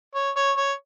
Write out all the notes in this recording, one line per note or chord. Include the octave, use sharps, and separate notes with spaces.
C#5
C#5
C#5